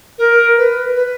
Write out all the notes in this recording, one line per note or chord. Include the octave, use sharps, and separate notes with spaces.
A#4
B4
B4